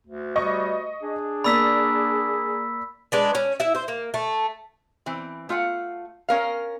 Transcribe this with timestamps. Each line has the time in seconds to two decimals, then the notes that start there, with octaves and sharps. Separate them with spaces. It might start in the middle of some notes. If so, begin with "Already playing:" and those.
0.07 D2
0.36 G3 D#5 C#6
1.03 D4 G#4
1.44 A#3 D5 B5 E6 B6
3.12 G#3 D4 B4
3.35 C#4
3.60 E4 E5
3.75 C5
3.88 A#3
4.14 A3
5.06 E3 C4
5.49 A3 F4 F5 F#5
6.29 C#4 A#4 F5